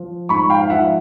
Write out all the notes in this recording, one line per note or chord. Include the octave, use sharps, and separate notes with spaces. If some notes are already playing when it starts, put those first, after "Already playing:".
Already playing: F3
G#2 B5 C#6
F5 G5
F5
F3 E5 F#5